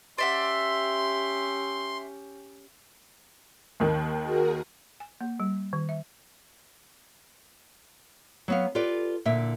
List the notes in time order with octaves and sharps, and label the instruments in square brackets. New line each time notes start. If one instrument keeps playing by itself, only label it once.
[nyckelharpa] C#4 G4 [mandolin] D5 E5 F#5 [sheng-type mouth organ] C6
[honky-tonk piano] D#2 D#3
[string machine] F#4 G#4 A#4
[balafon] G#5
A#3
G3
D#3
E5
[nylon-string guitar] F#3 B3 F5
F4 G4 A4 B4 D5
A#2 D3 E4 E5